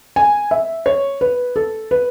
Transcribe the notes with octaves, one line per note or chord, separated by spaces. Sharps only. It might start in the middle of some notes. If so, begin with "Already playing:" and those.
G#5
E5
C#5
B4
A4
B4